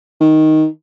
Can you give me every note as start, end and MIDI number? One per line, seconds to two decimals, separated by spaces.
0.21 0.65 51